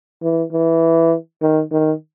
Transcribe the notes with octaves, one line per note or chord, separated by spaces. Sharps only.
E3
E3
D#3
D#3